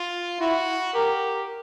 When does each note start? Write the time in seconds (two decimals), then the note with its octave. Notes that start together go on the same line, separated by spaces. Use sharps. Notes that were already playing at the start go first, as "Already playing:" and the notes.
Already playing: F4
0.40 E4 F#4
0.94 G4 A#4